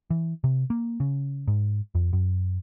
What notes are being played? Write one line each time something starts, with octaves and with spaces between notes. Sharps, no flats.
E3
C3
A#3
C#3
G#2
F2
F#2